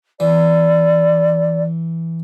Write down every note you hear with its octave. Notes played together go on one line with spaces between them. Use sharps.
E3 D5